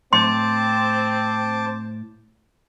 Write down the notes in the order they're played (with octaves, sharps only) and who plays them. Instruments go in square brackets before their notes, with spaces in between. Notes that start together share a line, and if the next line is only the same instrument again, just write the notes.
[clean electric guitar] A2 [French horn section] C4 [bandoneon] C5 A5 D6 [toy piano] C6